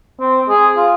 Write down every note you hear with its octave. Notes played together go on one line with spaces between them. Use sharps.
C4
G#4
F4